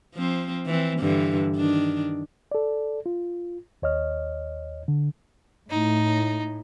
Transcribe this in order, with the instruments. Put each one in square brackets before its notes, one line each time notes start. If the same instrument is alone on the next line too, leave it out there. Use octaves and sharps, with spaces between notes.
[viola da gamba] F3 C4
E3 C4
G2 D3 E3
D#3 D4
[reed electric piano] A4 D5
F4
D#2 C#5 D#5 F6
D3
[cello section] A2 [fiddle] D#4